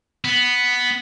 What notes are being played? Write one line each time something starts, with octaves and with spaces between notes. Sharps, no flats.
B3